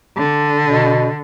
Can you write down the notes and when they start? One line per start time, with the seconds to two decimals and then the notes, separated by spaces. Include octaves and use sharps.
0.17 D3
0.63 B2